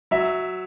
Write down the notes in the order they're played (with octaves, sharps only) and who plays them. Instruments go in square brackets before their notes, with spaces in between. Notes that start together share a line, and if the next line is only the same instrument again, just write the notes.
[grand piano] F#3 E5